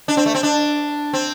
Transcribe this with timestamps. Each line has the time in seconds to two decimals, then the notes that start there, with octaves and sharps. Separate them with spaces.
0.08 D4
0.17 C4
0.26 A3
0.35 C4
0.43 D4
1.13 C4